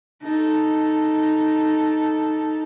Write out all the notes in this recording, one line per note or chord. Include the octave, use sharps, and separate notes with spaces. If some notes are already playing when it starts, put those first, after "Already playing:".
D#4 A4